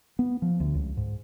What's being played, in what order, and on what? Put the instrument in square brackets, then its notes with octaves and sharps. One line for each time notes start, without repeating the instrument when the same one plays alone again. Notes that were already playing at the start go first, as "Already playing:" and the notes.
[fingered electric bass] B3
F3
D2
C#2
G#2